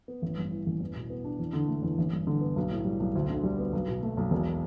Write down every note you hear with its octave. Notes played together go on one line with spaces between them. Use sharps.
B3
A1
G2
E3
A1
E2
B2
B3
D4
E2
D3
A3
E2
A1
G2
D3
B3
B1
A2
G3
B1
D2
D3
G3
B3
B1
B2
A3
B1
E1